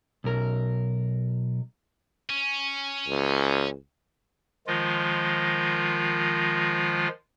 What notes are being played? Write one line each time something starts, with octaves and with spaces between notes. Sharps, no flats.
B1 A#4
C#4
C#2
D#3 F3 G#3 F4